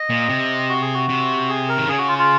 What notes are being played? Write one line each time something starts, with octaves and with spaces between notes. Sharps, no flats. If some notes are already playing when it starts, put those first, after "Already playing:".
Already playing: D#5
A#2
C3
F#4
G#4
F#4
C3
G#4
A#4
D#3
C#3 G#4
F#4
F4
F4